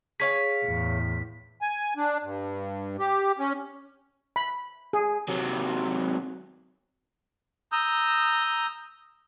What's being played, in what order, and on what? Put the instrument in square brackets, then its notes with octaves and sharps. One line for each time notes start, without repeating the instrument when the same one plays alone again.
[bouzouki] G#4 C#5 F5 [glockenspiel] B6
[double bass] E2 A2
[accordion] G#5
D4
G2
G4
C#4
[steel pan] B5
G#4
[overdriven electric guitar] C3 F#3
[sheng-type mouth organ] A#5 D#6 E6 G6